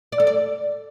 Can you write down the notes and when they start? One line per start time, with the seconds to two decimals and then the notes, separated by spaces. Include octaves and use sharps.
0.12 D5
0.20 A4
0.27 D5